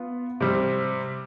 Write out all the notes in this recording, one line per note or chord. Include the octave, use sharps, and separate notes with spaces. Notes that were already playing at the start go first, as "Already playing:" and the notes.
Already playing: B3 F4
C3 G3 C4